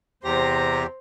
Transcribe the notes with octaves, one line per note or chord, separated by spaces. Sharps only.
E2 C3 G4 C5 A#5 A#6